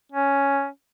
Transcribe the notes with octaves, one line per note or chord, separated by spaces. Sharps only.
C#4